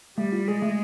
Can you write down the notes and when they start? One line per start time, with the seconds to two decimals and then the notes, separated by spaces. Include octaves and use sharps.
0.18 G3 A3
0.32 F4
0.48 G#3 G#4
0.62 A3